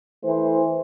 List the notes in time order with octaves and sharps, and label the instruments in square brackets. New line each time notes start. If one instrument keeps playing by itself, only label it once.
[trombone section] E3 A3 C5